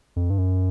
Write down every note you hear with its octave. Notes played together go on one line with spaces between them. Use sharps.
F2
G2
F#2